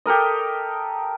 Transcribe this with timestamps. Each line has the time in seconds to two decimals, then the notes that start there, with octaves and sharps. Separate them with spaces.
0.06 G4 A4 A#4 D#5